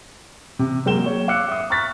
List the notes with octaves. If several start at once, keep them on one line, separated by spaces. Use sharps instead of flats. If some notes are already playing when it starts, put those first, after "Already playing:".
C3
F#3 G#3 A#3 G5 E7 G7
C#5
F5 D6 E6 F#6 C#7
E5 D#6
A#5 C#6 F6 F#6 A6 B6